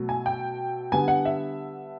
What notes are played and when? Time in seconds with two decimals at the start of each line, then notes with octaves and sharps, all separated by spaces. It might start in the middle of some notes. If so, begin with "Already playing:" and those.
Already playing: B2 F#3 A3
0.09 G#5
0.26 G5
0.92 D3 G3 B3 G#5
1.08 F#5
1.25 E5